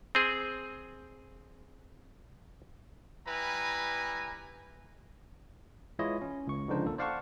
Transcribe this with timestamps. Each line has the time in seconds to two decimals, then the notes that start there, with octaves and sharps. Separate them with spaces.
0.15 C4 G#4
3.27 G3 E4 B4 G#5 A#5
5.99 E3 G#3 E4 F4 C#5 D#5
6.21 C#4
6.47 C#2 C#6
6.69 C#2 D3 F3 D4 D#4 C5
6.86 A#3 A4
6.98 C5 D5 F5 F#5 A5 C#6